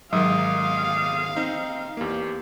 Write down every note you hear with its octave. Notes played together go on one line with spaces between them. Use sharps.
G#2 D#3 F#3 F5 D#6
C4 D#4
E2 A#3 G4